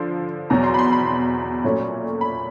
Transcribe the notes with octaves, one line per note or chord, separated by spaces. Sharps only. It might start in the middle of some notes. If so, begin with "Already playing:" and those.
Already playing: D3 F3 C6
E2 B2 F#3 A#5
C6
B5
C6
B5
A#2 F#3 A3 C#4
B5